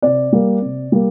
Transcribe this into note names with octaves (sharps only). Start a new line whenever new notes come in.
C3 D5
G3 A#3
C3
G3 A#3